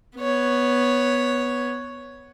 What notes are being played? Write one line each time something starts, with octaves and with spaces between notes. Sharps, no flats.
B3 C#5